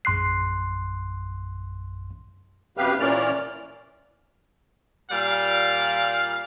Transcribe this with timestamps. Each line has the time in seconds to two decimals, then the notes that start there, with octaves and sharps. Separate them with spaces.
0.05 A#1 F#2 C6 F#6 C7
2.77 F#2 C3 B3 G4 B4 F5
3.00 A#2 E3 A#3 C#4 D5 F6
5.11 A#2 G3 F5